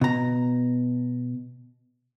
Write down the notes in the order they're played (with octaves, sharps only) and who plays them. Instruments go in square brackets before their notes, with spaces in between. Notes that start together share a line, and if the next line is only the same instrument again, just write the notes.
[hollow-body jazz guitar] B2 A#5